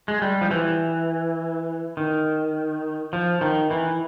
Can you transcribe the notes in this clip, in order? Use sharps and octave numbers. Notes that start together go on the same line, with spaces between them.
G#3
G3
F3
E3
D#3
F3
D#3
E3